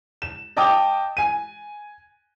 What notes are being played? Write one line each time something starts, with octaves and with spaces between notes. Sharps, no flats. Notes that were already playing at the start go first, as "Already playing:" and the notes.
E7
D#5 G5 A5 D6 D#6
G#5 D#7